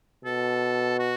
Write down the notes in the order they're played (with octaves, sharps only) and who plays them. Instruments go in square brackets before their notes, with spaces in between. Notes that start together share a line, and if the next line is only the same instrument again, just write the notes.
[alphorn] B2 [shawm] A4
[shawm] F#4